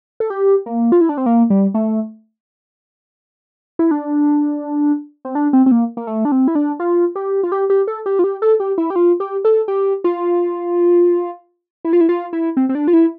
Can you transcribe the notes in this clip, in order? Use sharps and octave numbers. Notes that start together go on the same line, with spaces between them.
A4
G4
A#3
F4
E4
D4
C4
A#3
G3
A3
E4
D4
C4
D4
C4
C4
A#3
A#3
A3
D4
C4
E4
D4
F4
G4
F4
G4
G4
A4
G4
F4
G4
A4
G4
E4
G4
F4
G4
A4
G4
F4
E4
F4
E4
F4
E4
C4
C4
D4
F4
E4